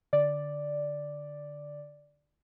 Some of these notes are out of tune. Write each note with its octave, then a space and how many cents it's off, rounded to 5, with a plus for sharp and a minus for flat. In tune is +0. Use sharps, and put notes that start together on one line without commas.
D3 +0 D5 +0